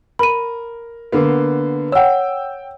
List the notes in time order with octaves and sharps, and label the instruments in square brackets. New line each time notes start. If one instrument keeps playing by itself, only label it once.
[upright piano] A#4 [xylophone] B5 D#7
[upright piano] D3 A#3 B3
[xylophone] C#5 F#5 [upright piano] G5 E6